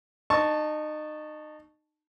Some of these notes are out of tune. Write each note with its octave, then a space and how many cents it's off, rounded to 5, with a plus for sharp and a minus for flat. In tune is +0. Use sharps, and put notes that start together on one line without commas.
D#4 -30 A5 +0 C#6 +0